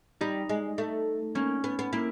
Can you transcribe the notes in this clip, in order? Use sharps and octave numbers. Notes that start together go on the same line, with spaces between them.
G3 D#4
G#3
A3
A#3 C#4
B3
B3
A#3 E4